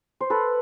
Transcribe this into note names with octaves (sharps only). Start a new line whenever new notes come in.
C5
A4 B4